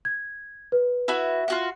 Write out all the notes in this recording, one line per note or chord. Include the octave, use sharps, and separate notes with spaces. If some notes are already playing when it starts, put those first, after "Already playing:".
G#6
B4
E4 F#4
F4 F#4 F#5